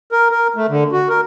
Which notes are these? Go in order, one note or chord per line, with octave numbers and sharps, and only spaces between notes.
A#4
A#4
A3
D3
F#4
A#4